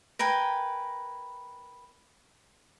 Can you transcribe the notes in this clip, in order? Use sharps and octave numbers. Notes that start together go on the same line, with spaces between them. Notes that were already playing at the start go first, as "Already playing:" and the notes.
A#4 B4 G5 G#5